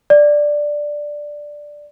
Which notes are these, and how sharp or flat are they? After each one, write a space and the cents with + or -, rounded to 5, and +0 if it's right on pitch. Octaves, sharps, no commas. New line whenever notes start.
D5 +5